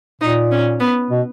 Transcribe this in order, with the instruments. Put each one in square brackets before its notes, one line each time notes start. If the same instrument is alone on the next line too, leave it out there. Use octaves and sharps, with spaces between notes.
[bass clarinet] A#2 [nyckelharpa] D#4
[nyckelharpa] C#4
B3
[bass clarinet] B2